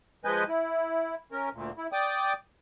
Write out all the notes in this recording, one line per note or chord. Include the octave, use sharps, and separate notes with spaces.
F3 G#3 B4 D#5 G#5 G6
E4
C#4 A#4
D2 A#2
E4
D5 G5 D6 D#6